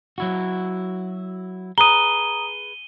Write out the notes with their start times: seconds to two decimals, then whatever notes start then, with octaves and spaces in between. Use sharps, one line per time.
0.18 F#3 E4 F#4
1.78 G#4 B4 A#5 D#6 D#7 G7